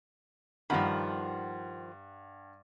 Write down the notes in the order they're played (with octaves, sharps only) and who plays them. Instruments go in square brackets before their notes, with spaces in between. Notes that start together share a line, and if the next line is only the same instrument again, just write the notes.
[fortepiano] G2 F#5 B5 [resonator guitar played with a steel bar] D#3 F3